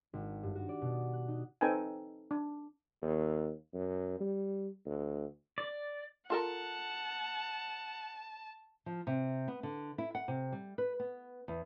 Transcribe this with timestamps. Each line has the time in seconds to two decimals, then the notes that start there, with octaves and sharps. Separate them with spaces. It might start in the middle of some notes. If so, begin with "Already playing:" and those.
0.13 G#1
0.43 G2
0.55 F#4
0.69 D5
0.82 B2
1.13 F#6
1.28 D#4
1.61 C4 D#4 A4 B4 G5 G#5
2.31 D4
3.02 D#2
3.74 F#2
4.20 G3
4.86 D2
5.58 D5
6.30 F4 A4 A#4 F#5 A5
8.86 F3
9.07 C3
9.48 B3
9.63 D3
9.98 E4
10.15 F#5
10.28 C3
10.52 G3
10.78 B4
11.00 B3
11.48 E2